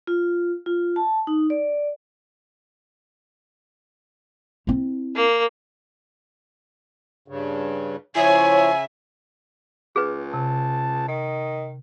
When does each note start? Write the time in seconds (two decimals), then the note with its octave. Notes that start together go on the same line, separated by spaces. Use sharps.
0.07 F4
0.66 F4
0.96 A5
1.27 D#4
1.50 D5
4.67 C4 E4
5.16 A#3
7.28 G2 C#3
8.16 C#3 F3 E4 C#5 E5 G#5
9.96 C#2 G#4 B4
10.34 C3 A5
11.08 D#3 D#5